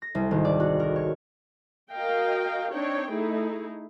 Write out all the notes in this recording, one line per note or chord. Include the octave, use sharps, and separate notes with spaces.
A#6
C2
G#1
D5
F#4
A#4
C#5
F#4 A#4 D#5 F5 G5
C4 D4 D#4 C#5 G5
A3 D#4 E4 G#4